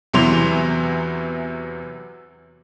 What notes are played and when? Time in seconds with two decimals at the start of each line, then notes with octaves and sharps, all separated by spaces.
0.14 E2 C3 E3 F#3 C6 F7